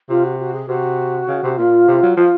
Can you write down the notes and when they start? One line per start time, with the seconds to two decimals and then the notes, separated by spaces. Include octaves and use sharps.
0.09 C3 F4
0.24 F#4
0.40 F#4
0.54 G#4
0.68 C3 F#4
1.28 C#3
1.43 C3
1.57 A#2 F4
1.88 C3
2.02 F#3
2.17 F3 F4